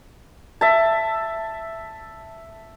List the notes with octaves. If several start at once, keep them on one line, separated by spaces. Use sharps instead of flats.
E5 A5